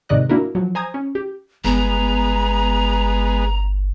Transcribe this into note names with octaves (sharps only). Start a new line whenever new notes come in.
G#2 C3 D#3 D5 D#5 F#6
A#3 D4 E4 F#4 A#4
F3 F#3
C5 G#5 A#5 D#6 G#6
C#4
G4
G1 G#3 B3 A#5